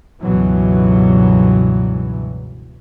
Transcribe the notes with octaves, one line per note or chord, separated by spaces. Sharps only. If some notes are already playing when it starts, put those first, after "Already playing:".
C#2 G2 B2 E3 F#3